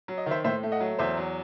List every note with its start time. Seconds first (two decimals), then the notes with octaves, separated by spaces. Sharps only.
0.08 F#3
0.18 D#5
0.26 D#3 C5 E5
0.44 A2 C5 E5
0.63 A3
0.72 D#5 F#5
0.80 F#3
0.99 E2 C5 E5
1.17 F#3